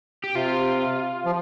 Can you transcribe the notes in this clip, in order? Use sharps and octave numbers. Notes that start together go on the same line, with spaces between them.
G4
C3 F4
F3